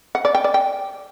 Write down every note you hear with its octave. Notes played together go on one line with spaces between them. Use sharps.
F#5
D5
G5
D5
G5